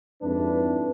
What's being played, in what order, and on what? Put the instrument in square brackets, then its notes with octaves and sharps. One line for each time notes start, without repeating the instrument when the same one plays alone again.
[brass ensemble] F2 G#2 D4 E4 B4